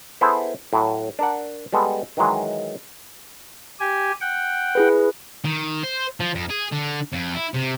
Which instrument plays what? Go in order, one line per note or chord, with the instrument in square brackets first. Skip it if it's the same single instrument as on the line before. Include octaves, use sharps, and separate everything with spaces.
[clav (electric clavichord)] B3 E4 G#4 A4 C5
A2 F#3
D4 A#4 F#5
G3 G#3 B3 A4
D#3 E3 F#3 G#3
[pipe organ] G4 G#5
F#5 G5
[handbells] E4 G#4 B4
[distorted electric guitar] D#3
C5
F3
F2
G#4
D3
F2
E4
C3